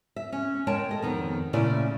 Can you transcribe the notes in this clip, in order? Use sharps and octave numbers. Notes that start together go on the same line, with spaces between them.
E5
C#4
G#3 A#4 C#5 G5 A5
A4 D#5
F2 D#3 B3
A#2 C#3 A3 C#4 E4 D5